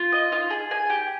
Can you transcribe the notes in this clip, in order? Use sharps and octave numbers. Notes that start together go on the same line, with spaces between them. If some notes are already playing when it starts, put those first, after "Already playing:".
Already playing: F4
D#5
F4
G#4
G#5
G4